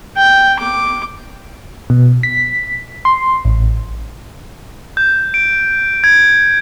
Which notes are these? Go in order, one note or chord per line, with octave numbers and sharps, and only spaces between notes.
G5
D6
B2
B6
C6
A1
G6
D7
G#6